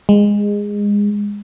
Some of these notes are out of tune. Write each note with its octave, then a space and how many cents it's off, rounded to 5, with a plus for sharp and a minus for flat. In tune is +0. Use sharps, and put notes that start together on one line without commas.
G#3 -20